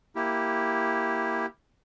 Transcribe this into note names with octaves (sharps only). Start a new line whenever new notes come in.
A#3 E4 G4